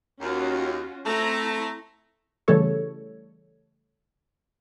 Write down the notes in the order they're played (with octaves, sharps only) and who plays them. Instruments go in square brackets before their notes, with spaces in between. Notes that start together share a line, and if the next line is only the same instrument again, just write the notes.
[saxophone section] D#2 [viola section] C#4 F4 F#4
[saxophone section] A3 [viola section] C4 E4 A#5
[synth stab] C#3 E3 G3 A3 A4 C#5